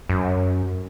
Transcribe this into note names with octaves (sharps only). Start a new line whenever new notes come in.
F#2